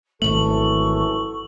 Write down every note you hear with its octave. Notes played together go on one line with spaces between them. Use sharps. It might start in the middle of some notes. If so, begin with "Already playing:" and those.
G#1 C#2 F#2 E3 A3 A4 C#6 F#7